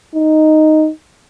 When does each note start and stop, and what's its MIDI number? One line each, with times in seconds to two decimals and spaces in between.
0.15 0.90 63